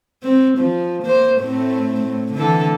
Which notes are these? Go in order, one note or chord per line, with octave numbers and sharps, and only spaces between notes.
C4
F3
A#3 C5
A2 A3 C4
A2
D3 E3 A4